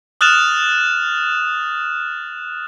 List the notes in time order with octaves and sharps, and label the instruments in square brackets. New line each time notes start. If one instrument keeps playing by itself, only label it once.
[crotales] D#6 F6 F#6 A6 E7 F7